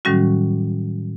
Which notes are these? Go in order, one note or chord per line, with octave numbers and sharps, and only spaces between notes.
A2 D#3 F#3 G3 C#4 F#4